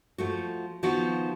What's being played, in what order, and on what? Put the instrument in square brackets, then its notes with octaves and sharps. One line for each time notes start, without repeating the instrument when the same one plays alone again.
[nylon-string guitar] F3 A3 F#4
D#3 F3 B3 F#4